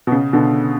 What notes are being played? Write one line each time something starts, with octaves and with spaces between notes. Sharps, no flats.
B2
C#3
B2 D3